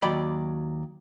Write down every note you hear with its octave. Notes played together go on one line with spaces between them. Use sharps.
D#2 F#3 D5 G5 B5